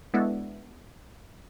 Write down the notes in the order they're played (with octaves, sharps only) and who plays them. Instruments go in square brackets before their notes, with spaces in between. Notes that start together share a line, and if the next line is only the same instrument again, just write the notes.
[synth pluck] G#3 B3 D4 E4 F#4 A4